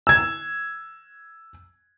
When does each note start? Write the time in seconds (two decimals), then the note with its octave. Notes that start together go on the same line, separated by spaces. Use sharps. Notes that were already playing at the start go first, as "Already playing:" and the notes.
0.07 E6 G#6